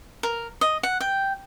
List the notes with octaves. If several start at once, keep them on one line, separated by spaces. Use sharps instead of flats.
A#4
D#5
F#5
G5